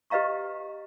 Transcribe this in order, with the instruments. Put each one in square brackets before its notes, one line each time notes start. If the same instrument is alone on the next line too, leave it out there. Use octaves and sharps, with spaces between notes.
[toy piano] G4 B4 D#5 F5 A#5 C#6